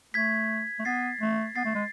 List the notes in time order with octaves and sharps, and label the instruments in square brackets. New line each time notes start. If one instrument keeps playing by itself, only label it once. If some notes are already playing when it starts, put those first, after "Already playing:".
[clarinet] A3 [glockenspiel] G#6 B6
[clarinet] A3
[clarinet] B3 [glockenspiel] A6 C7
[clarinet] A3
[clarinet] B3 [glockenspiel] A6 C7
[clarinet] A3
G#3